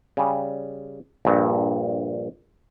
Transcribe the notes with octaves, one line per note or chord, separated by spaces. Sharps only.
C#3 G3
A#1 G2